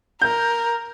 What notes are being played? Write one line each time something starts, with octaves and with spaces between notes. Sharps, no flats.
A#4 G6